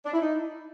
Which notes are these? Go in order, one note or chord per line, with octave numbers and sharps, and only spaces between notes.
D4
E4
D#4